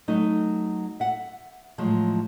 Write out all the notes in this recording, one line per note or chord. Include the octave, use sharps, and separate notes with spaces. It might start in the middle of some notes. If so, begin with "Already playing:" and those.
F#3 A3 D#4
E5 F#5
A2 F3 F#3 G#3